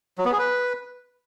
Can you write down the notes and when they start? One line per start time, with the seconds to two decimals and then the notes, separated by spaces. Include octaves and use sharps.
0.18 F#3
0.25 B3
0.32 G#4
0.39 B4